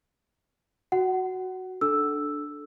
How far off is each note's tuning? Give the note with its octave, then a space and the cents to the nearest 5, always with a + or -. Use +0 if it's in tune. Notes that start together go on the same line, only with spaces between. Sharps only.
F#4 +0 F#5 +25
D4 +0 A4 -15 E6 +0